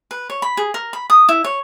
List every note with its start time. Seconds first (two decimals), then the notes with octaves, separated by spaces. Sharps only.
0.11 B4
0.30 C#5
0.42 B5
0.57 G#4
0.74 A#4
0.93 B5
1.10 D#6
1.29 E4
1.44 C#5